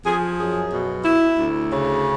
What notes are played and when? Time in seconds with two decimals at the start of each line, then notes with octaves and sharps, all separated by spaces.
0.05 F3 G#4
0.38 F#2 G#4
0.71 B2
1.04 E4
1.37 D2
1.71 C#3